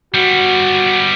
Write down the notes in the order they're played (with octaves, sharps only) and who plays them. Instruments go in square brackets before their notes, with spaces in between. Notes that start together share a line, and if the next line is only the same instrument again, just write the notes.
[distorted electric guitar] G3 B3 [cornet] F#4